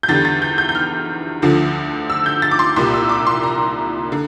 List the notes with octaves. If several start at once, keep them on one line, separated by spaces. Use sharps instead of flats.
G6
E2 D3 G3 A6
A6
G6
G6
G6
F6
D2 D3 F3
E6
G6
A6
D6
C6
C2 A#2 G3 C6
E6
D6
C6
A#5
D3